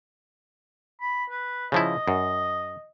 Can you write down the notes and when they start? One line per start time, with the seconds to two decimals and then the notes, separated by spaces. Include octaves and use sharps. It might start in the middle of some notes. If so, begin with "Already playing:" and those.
1.01 B5
1.30 B4
1.72 C#3 F3 E4 D#5
2.08 F#2